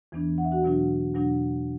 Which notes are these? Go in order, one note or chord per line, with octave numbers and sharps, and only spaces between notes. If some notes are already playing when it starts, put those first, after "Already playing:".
E2 E3 B3 D4
F#5
E5
F#4 F#5
E2 B2 F#3 D4
E2 B2 F#3 D4